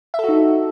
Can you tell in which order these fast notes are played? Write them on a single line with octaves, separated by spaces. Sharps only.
E5 A4 F#4 D#4